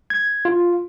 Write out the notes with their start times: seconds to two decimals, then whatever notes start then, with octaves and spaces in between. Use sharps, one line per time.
0.10 G#6
0.45 F4